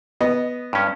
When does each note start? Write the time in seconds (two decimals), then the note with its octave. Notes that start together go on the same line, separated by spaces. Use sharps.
0.21 B3 D#5
0.73 G2 C#4